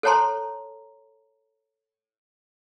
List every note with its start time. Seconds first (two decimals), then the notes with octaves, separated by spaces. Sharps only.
0.03 A4 C5 C#5 A5 A#5 C6